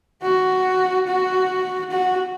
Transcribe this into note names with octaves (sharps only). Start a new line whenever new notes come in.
F#4
F#4
F#4